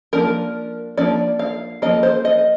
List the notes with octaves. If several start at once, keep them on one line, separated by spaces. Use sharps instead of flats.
F3 A#3 D4 A#4
F3 A#3 D4 D5
F5
F3 A#3 D#5
C5
D#5